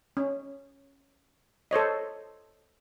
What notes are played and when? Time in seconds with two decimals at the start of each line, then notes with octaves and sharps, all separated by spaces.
0.17 C#4
1.71 A4 C5 C#5 D#5